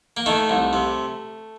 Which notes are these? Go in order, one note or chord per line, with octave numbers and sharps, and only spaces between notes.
A#3
D#3 A3
C2
C3